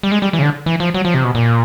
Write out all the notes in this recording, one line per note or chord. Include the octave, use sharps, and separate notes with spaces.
G3
G#3
G3
E3
C#3
D3
E3
F3
F#3
F3
C3
B2
A#2